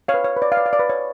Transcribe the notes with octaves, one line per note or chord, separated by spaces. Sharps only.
C#5 F5
B4
C#5
B4
D5
F5
B4 D5
F5
D5
B4
C#5